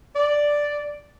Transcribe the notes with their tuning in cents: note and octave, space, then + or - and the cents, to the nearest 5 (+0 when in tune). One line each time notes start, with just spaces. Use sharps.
D5 +0